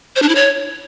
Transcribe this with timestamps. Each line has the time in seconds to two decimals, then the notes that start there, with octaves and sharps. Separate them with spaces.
0.16 C5
0.22 D4
0.29 E4
0.35 C#5